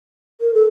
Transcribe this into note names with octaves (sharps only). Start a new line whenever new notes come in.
A#4
A4